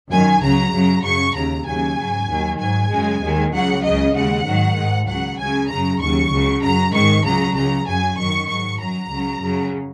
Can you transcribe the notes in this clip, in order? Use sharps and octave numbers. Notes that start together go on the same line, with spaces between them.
F#2 D#3 F#3 G#5
C#2 C#3 F#3 A#5
F#2 C#3 F#3
F#2 C#3 F#3 C#6
D#2 C#3 F#3 A#5
D#2 C#3 F#3 G#5
G#2 F#3
D#2 D#3 F#3
G#2 F#3 G#5
F#2 C#3 G#3
D#2 D#3 G#3
C#2 C#3 F#3 F#5
C#2 C#3 F#3 D#5
D#2 C#3 G#3 F#5
G#2 D#3 F#3
G#2 G#3
C#2 C#3 F#3 F#5
C#2 C#3 F#3 G#5
F#2 C#3 F#3 A#5
D#2 C#3 F#3 C#6
C#2 C#3 F#3
F#2 F#3 A#5
G#2 D#3 G#3 C#6
C#2 C#3 F#3 A#5
C#2 C#3 F#3 A#5
F#2 C#3 F#3 G#5
F#2 D#3 F#3 C#6
G#2 F#3 C#6
F#2 F#3 A#5
C#2 C#3 F#3
F#2 C#3 F#3